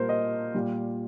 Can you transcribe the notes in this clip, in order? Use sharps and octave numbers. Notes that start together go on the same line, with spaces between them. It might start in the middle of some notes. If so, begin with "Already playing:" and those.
Already playing: A#2 G3 A#4 C5
D#5
A#2 G3